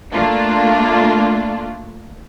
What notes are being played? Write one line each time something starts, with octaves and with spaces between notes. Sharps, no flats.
A3 A#3 D4 F4